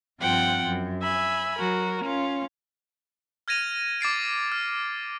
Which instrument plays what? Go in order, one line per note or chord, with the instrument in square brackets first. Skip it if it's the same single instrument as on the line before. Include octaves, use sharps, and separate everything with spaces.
[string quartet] G2 F3 C4 F4 F#5 G5
F#2
E5 G#5 B5
F#3 F#4 A#4
C#4 F4
[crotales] F6 G#6 A#6 D#7 F7
D6 A6 C7 D7
F6